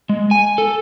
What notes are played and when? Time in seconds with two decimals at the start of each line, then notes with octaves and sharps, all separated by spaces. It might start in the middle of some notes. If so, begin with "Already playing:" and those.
0.09 G#3
0.31 G#5
0.58 A4